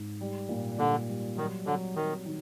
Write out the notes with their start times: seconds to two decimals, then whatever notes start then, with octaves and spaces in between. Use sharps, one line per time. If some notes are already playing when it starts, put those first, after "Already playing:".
Already playing: G#2
0.21 G3
0.49 A#2
0.78 A#2 D3
1.08 G3
1.36 D#3 F#3
1.66 D3 F#3
1.96 D#3 F#3
2.25 D#3